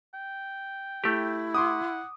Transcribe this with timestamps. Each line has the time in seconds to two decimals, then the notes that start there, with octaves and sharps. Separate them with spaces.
0.14 G5
1.04 A3 E4 G4
1.55 F#5 C6 D6 D#6